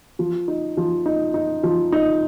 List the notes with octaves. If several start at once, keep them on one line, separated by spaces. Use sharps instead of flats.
F3
D#4
F3
D#4
D#4
F3
D#4